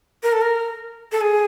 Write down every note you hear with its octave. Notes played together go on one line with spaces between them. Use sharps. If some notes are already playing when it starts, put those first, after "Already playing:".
A#4
A4
A#4
A4
G#4